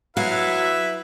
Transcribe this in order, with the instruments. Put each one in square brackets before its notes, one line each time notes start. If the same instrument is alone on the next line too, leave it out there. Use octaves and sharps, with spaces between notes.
[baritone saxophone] F#3 [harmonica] E4 B4 [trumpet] E5 [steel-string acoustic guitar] F5